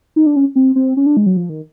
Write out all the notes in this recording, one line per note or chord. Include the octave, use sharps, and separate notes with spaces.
D#4
D4
C#4
C4
C4
C#4
D4
G#3
F#3
F3
D#3